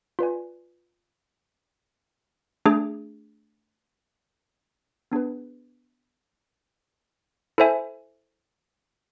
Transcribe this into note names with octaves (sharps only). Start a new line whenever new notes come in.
F4 B4 D5 G#5
A3 D4 G#4
B3 D4 G#4 B4
E4 A4 C5 E5 G#5